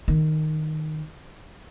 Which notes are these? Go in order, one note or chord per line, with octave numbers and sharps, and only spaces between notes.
D#3